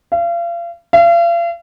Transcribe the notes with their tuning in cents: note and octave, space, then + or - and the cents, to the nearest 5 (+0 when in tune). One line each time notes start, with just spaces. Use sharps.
F5 -35
F5 -40